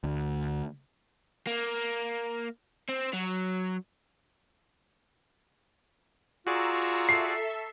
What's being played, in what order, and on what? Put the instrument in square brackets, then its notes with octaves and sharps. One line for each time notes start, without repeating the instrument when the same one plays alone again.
[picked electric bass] D2
[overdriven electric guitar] A#3
C4
F#3
[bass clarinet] F4 [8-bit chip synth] F#4 G#4 D5 [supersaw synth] A#5 C#6 E6
[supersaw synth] A4 E5 [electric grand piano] C7